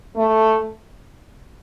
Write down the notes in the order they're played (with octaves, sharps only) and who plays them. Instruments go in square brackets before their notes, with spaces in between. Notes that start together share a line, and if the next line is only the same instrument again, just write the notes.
[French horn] A3